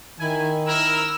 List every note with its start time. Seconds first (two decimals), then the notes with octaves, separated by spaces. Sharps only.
0.20 D#3 E4 G#5
0.68 E4 A#4 E6